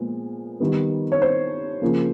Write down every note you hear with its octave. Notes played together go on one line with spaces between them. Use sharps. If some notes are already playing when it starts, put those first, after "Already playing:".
Already playing: A#2 F3 G#3 B3
D#3 G3 B3
C#5
C5
C#3 F3 A#3